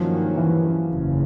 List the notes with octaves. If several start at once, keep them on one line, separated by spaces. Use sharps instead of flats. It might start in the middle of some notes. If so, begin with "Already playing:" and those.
Already playing: G2 D#3 F3 F#3 A#3 C#4
E3
F#1 E2 C#3